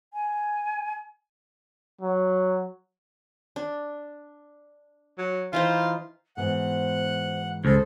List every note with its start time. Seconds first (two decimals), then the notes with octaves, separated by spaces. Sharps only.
0.14 G#5
2.01 F#3
3.56 D4
5.18 F#3
5.53 E3 D#4 F4 C5
6.37 G#2 B2 E3 C5 F#5
7.65 C#2 G#4 A4 C5